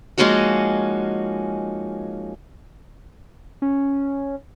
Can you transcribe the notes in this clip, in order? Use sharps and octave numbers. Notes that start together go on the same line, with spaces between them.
F3 G#3 A#3 C#4 D#4 F#4
C#4